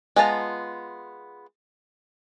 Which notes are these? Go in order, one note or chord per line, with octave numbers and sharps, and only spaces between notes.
G#3 B3 F4 A5 A#5